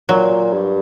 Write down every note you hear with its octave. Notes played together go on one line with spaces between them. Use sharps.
A#2 F#3
G2